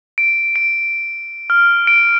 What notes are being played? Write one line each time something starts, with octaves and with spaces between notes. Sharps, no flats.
D7
D7
F6
D7